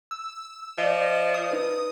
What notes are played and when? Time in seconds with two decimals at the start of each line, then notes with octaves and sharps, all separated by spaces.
0.11 E6
0.78 F3 D5 D#5
1.34 D#6
1.51 D#4 B4